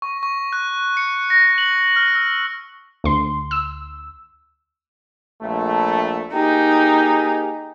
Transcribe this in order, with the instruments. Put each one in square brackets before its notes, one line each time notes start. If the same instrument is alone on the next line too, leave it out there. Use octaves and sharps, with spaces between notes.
[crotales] C#6
C#6
F#6
C#7
A#6
F#7
F6
E6
[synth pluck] D2 C6
E6
[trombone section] A#1 A3
[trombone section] A#3 G4 G#4 [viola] D#4